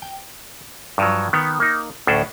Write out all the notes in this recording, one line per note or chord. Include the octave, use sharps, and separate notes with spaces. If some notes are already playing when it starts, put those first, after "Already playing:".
G5
G2 F3 F#3
D#3 B3
A#3 D#4
D2 A2 C#4 D4 C5